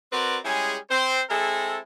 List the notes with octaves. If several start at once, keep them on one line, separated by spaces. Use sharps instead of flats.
C4 F#4 A#4 B4 D5 C6
G3 G#3 C#4 E4 G#4
C4 C5
G#3 C4 E4 G#4 A4